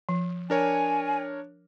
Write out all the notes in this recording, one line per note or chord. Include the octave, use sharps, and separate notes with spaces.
F3
D4 A#4 C#5 G#5